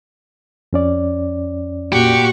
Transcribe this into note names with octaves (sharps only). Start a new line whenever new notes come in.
F2 C#4 D5
A#2 F#4 G4 C#6